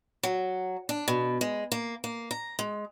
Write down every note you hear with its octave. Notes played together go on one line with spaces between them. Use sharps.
F#3
D4
B2
G#3
A#3
A#3
A#5
G#3